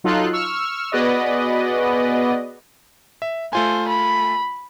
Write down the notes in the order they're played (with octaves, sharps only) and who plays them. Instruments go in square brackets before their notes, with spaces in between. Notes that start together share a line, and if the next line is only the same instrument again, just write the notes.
[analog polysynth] F#3 D#4 F4 A4 C6 F#6
C#6 E6 F6
B3 F#4 G#4 B4 D5 D#5
[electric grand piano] E5
[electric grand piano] A3 F4 G#5 [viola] C5
[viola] B5